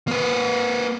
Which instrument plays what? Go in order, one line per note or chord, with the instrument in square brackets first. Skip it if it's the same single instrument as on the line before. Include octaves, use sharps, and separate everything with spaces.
[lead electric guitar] A#3 B4